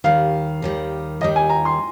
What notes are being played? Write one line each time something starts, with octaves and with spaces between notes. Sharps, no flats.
D#2 D#3 G3 F5
D#2 D#3 G3
D#2 D#3 G3 D#5
G#5
A#5
C6